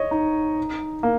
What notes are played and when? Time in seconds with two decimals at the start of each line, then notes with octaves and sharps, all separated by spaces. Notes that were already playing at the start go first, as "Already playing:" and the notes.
Already playing: C#5 D#5
0.11 D#4
1.03 A#3